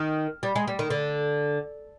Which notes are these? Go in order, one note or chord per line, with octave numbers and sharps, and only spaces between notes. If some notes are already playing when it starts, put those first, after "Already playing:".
Already playing: D#3
G3
G#3
G3
D#3
D3